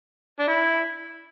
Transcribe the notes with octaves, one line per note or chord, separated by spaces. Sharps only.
D4
E4